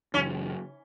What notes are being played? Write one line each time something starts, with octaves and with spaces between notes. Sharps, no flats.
F#2 C#3 E3 C#4